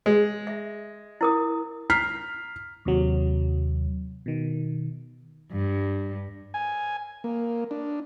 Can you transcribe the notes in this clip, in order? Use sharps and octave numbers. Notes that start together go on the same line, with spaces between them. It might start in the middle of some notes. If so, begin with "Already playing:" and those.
G#3
E5
E4 A#4 D#6
A#5 F6 B6 C7
D#2 C3 F#3
B2 D#3
G2
G#5
A#3
D4